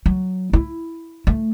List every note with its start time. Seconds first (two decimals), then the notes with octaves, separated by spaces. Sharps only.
0.06 F#3
0.53 E4
1.27 A3